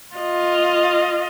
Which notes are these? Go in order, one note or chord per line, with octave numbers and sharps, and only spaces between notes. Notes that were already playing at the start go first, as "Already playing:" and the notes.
F4 D#5